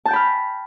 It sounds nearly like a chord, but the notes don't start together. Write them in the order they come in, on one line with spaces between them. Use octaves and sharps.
A5 G6 G5 B5 F6